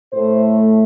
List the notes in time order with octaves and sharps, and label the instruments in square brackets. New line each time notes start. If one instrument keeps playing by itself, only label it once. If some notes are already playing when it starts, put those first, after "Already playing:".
[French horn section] A2 A3 C5